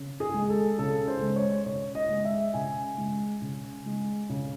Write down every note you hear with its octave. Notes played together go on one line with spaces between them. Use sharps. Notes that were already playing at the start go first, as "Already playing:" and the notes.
Already playing: C#3
G#4
G#3
A4
C#3 A4
C5
G#3
C#5
C#3 C#5
D#5
G#3
E5
C#3 G#5
G#3
C#3
G#3
C#3